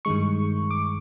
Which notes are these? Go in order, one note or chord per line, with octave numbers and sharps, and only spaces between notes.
G2 D#3 G#3 C#6
D6